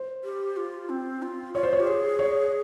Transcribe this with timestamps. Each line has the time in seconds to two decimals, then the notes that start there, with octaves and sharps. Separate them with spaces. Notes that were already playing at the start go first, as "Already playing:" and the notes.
Already playing: C5
0.24 G4
0.57 F4
0.89 C4
1.22 F4
1.54 F4 C#5
1.63 C5
1.73 C#5
1.80 G4
1.87 G#4
2.19 C#5